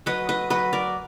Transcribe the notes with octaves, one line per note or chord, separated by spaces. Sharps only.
F#3 B4 D#5
B4 D#5
F#3 B4 D#5
A#4 D5